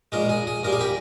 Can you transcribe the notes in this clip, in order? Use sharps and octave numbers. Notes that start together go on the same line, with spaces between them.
A#1 A#2 G#3 A#4
G#4
G#4
A#1 A#2 G3 A#4
G#4
G4